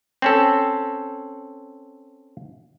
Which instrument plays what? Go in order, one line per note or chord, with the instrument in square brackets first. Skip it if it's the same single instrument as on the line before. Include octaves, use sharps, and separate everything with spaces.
[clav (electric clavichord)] C4 C#4 A4